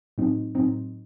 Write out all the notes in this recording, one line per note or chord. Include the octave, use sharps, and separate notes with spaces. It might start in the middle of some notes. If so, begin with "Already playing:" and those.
A2 F#3 C4 D#4
A2 F#3 C4 D#4